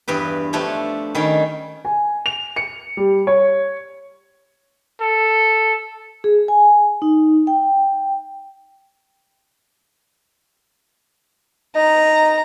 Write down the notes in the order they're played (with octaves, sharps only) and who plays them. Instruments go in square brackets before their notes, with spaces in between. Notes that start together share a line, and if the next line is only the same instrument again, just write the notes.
[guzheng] E2 G2 G4 B4
F3 A3 D4 G4 C#5
D#3 G3 C#4
[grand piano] G#5
F7
C#7
G3
C#5
[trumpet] A4
[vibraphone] G#4
G#5
D#4
G5
[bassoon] D#4 [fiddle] A#5